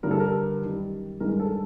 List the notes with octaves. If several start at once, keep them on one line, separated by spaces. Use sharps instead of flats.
G2 D3 G3 A#4
A4
A#4
F#2 D#3 G3
G2 D#3 G#3 A#4
A4